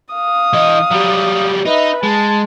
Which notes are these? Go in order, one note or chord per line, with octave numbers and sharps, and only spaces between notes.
F5 D#6
E3 D#5
F#3 G3
D#4 B4 E5
G#3 A5